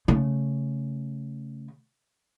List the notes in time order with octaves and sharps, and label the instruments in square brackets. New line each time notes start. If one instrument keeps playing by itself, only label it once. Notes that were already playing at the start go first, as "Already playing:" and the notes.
[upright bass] C#3 A3